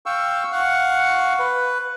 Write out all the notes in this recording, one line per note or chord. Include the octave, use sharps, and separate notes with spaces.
F5 G5 C#6 E6
F5 F#5 C#6
B4